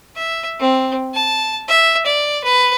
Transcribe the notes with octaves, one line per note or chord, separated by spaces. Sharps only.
E5
C4
A5
E5
D5
B4